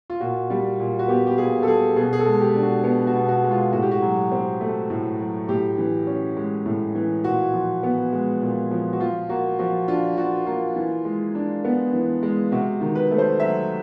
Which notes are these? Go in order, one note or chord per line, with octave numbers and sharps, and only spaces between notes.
F4
A#2 F#4
G3
A#2
F#4
B3 G4
G4
A#2 G#4
A4
G3 G#4
B2 G#4
G#4
A4
G#3
G4
D4
F#4
B3
F#4
B2
F#4
G#3
F4
A2 F#4
G4
F#4
F#3
C4
A3
A2
F#3
A2 G4
E3
C#4
G#3
A2
E3
A#2 F#4
F3
B3
G#3
A#2
F3
F#4
F3 F4
A#3 F#4
F3 F#4
D4 F4
F3 F#4
A#3 F4
E3
G#3
D4
B3
E3
G#3
C3 F#4
D#3
B4
A3
C5
F#3 E5